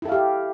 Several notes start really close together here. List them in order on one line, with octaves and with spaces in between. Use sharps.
E4 A4 F5 G4